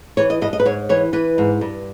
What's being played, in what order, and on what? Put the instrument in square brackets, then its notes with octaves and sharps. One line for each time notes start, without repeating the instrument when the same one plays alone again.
[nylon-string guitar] E3 C#5
D#5
G2 D#5
D#5
B4
G#2 C#5
E3 C#5
E3 B4
G#2
G2